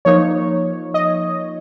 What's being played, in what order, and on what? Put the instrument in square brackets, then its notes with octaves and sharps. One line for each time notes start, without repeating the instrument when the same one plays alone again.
[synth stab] F3 A#3 D#4 C#5
D#5